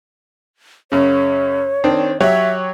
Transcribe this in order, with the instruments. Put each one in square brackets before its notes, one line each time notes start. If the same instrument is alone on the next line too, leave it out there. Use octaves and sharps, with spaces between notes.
[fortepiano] F#2 C#3 [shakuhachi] C#5
[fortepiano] D#3 C4 D4
[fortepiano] F#3 G4 C#5 [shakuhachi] E5